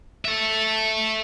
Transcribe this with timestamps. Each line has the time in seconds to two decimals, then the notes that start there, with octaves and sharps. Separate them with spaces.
0.25 A4 E5